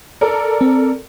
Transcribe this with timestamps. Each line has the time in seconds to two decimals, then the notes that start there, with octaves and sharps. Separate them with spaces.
0.21 A4 A#4 D5
0.61 C4